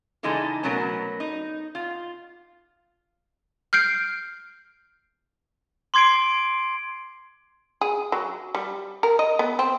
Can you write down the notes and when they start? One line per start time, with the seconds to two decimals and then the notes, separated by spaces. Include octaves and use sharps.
0.23 C#3 E3 G#3 D#4 A4 A#5
0.63 B2 F#3 A3 C#4 A#4 B4
1.20 D#4
1.75 F4
3.73 F6 G6 C7 D7
5.94 C6 D6 G#6 C7 D7
7.81 G#4
8.12 F#3
8.55 G3
9.03 A#4
9.19 D#5
9.39 B3
9.59 C4